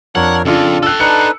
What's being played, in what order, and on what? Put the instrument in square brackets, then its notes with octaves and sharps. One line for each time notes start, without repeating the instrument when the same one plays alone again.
[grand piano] F2 [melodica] D4 A#4 C#5 [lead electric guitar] F#5
[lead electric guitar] F2 [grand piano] C#3 D4 F4 [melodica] A4
[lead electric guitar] A4 G5 [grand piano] E6 F#6
[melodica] D4 D#4 B4 [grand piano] C#7